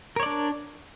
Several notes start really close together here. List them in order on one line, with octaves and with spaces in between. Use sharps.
A#4 C#5 D5 D4